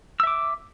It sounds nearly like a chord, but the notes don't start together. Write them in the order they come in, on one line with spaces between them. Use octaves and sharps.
E6 E5 D6